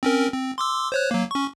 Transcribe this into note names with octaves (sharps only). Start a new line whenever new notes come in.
C4 C#4 A#4
C4
C6 D6 E6
C5 C#5 F#6
F#3 A#3
C#4 C#6